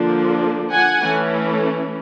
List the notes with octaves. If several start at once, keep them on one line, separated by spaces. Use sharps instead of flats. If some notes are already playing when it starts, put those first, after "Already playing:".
Already playing: D3 F3 A#3 D4
F#5 G#5
E3 A3 C#4